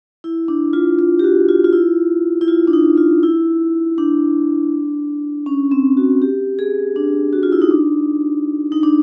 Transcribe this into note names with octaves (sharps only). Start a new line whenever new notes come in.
E4
D4
F4
F4
G4
F#4
F4
F4
E4
E4
F4
D4
D#4
F4
E4
D4
C#4
C4
F#4
G4
G#4
D4
F#4
F4
E4
D#4
D4
D#4
D4